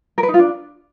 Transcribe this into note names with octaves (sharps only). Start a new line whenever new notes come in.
A#4
B4
D#4
F4
D4